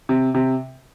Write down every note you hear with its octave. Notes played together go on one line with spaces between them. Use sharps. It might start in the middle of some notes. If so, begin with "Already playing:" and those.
C3
C3